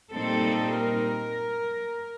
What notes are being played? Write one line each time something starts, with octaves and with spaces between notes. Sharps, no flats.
A#2 G3 C4 D#4 A4
A#4